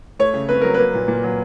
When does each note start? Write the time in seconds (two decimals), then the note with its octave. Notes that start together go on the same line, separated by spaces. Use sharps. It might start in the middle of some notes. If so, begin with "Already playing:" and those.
0.19 A3 C#5
0.34 C#3
0.49 C4 B4
0.61 F#3 A#4
0.74 A#3 B4
0.94 A#2
1.08 A#2
1.23 F#3